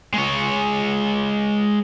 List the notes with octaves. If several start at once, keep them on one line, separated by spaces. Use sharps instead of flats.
G#3 C#5